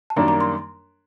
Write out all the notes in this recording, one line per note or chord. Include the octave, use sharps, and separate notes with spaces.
A5
F#2 D#3 G3 A#3 D4 A#5
A#5
C6